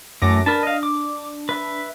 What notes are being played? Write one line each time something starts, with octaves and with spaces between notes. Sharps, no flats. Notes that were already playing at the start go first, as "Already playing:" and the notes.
F#2 E3 A3 D6 A#6
D4 A#4 B4 A5
D#5 F5
D6
B4 E5